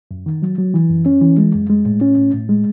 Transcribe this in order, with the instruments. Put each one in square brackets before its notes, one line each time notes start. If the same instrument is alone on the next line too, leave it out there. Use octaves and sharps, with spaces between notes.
[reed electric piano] F#2
D#3
F#3
F#3
E3
F#2
C#4
E3
G#3
F#2
G#3
A2
C#4
A2
A2
G#3